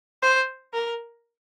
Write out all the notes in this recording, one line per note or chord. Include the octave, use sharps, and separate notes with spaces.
C5
A#4